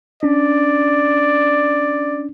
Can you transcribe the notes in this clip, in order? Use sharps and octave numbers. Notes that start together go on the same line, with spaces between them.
C#4 D4 D5